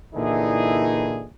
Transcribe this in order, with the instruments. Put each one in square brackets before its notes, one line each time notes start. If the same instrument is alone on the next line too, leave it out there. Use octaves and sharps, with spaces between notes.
[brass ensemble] A#2 D3 E3 D#4 E4 G#4